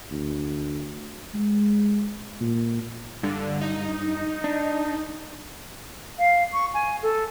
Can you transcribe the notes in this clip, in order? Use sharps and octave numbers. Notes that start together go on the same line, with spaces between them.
D2
G#3
A#2
G2 D3
D#4
D4
F5
C#6
G#5
A4